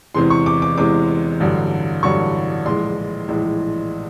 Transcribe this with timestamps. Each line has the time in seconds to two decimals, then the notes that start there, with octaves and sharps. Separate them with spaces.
0.15 E2 C3 E3 G#3 C6
0.30 C#6
0.46 D6
0.62 D6
0.78 E2 C3 E3 G#3 D6
1.40 A1 G2 D3 F#3
2.03 A1 G2 D3 F#3 C#6
2.66 A#1 A2 E3 G#3 C6
3.28 A#1 A2 E3 G#3